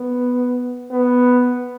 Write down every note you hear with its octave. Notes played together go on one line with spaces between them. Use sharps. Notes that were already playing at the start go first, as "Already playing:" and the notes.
Already playing: B3
B3